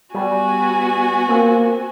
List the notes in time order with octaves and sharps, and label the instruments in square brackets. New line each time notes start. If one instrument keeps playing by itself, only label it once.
[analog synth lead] G3 [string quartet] B3 F#4 G#5
[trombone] A#3 [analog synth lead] C4